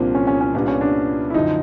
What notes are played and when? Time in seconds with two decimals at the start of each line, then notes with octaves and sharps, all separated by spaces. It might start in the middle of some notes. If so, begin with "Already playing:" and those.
Already playing: C2 A#2 F3 A#3 C4 D4
0.15 C#4
0.27 C#4
0.41 C#4
0.54 C2 A#2 G3 B3 D4
0.68 C#4
0.81 D4
1.30 E4
1.34 F#2 D3 F3 D#4